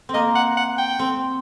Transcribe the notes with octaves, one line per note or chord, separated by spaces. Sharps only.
C4
A#3 D#5
F#5
F#5
G5
C4